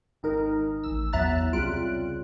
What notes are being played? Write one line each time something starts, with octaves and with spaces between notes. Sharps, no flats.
G#1 D#4 A#4
A1 E6
E2 F#3 E5 A#5 F#6 A6
C2 C#3 G3 F4 F#6 D7